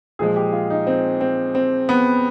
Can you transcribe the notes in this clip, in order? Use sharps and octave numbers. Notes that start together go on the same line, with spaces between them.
A#2 F3 G#3 G#4
G4
F4
D#4
C4
C4
C4
B3